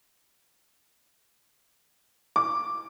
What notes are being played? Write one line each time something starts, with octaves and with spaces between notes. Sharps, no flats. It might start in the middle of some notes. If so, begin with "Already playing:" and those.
D6